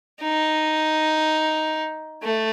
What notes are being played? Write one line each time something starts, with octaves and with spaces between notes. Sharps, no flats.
D#4
A3